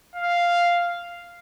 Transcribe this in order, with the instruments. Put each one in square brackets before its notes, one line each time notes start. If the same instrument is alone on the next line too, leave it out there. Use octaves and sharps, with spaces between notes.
[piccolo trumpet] F5